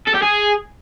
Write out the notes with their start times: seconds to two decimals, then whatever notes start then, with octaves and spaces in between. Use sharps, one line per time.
0.08 A4
0.15 G4
0.23 G#4